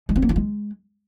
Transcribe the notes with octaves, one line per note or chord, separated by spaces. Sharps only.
G#3
C4
A#3
F4
G#3